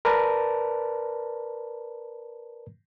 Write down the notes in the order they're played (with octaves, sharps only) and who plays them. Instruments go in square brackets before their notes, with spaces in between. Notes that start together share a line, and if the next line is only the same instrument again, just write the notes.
[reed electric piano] A#4 B4 D5 A5